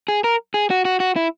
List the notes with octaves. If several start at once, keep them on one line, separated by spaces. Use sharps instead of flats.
G#4
A#4
G#4
F#4
F#4
F#4
E4